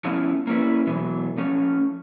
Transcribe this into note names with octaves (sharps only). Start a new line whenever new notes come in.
F3 A3 B3 C#4 E4 F4
A#3 C#4 E4 B4
B2 E3 F#3 B3
F3 A3 C#4